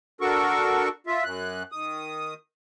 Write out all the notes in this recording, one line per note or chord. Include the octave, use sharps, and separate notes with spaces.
D4 F#4 A4 A#4 C#6
F4 E5
F#2 F#6
D#3 D#6